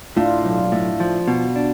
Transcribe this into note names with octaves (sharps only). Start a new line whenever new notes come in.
A2 D4 F4
B1
A2
F3
B2
D4